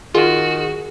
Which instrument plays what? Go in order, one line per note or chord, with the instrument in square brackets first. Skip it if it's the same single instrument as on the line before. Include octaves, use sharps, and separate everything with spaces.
[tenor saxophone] D#3 [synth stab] F4 [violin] F#4 [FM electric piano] G#4